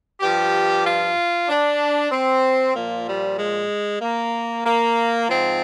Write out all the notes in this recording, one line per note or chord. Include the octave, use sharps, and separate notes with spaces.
G2 F3 G4
F4
D4
C4
A#2 F3 A#3
G3
G#3
A#3
A#3
G#2 F3 C4